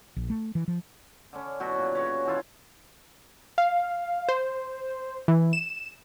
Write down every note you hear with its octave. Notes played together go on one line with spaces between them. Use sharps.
A#1
A3
E3
F3
D3 C#4
B2 F#3 F#4
A#2
C#3 F#4 B4 C#5
B2 E3 E4 F4
F5
C5
E3
E7